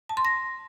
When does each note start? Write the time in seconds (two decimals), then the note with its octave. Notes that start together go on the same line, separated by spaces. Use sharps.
0.09 A5
0.17 C6
0.25 A#6